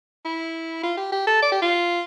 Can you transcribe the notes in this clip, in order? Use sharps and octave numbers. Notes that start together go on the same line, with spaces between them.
E4
F4
G4
G4
A4
D5
G4
F4